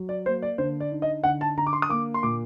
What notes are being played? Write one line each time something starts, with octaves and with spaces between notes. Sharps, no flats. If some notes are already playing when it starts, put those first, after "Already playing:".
Already playing: F#3
D5
A#3 C5
D5
D3 C5
D5
D#4
D#5
D3 F#5
A5
D3 A#5
D6
C6
D#6
A#3 D6
C6
A#2 D6